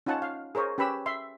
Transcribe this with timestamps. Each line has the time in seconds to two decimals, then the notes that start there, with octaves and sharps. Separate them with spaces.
0.06 C#4 D#4 F4 F#5 A5
0.22 F5
0.55 G#4 A#4 C5 C#5
0.78 C#4 G4 B4 B5 E6
1.06 E5 C6